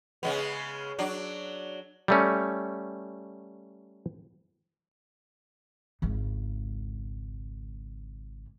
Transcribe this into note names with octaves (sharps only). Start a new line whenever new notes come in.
C#3 G#3 B3
F#3 D4
G3 A3 C#4
G#1 C#2